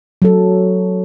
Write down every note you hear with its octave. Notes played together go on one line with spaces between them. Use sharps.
F#3 A4